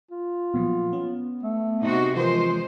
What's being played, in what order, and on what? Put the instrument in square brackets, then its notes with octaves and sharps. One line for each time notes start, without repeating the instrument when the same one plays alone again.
[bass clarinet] F4
[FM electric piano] A#2 F3 F#3 [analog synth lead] B3
[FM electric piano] C#4
[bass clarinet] A3
[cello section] C3 D#4 F#4
[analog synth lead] E3 [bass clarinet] F3 [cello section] G#3 C5 [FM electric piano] F4 A#4 D#5